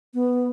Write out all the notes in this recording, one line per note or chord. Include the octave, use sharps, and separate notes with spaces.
B3